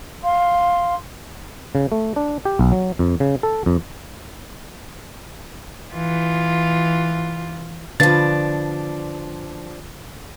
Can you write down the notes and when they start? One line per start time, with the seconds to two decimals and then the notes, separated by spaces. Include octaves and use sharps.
0.23 F5 C6
1.75 C#3
1.92 A3
2.16 D4
2.45 G4
2.59 B1
2.72 F#3
2.99 F2
3.20 C#3
3.43 A4
3.66 F2
5.93 E3 F4
8.00 D3 F3 D4 B4 F5 A6